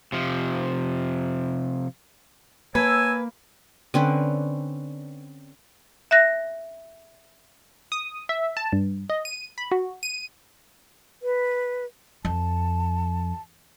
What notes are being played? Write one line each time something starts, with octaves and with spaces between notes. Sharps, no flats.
C3 F3
A#3 B4 C#5 G#5 A5 E6
D3 C4 C#4 B4
E5 F#6 A#6
D#6
E5
A5
G2
D#5
D#7
B5
F#4
D#7
B4
F2 A5